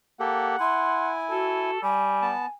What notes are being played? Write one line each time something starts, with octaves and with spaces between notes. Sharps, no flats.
A#3 G4 A4 F#5
E4 G#5 C6
F#4 A4
G3 G#5
B3 A5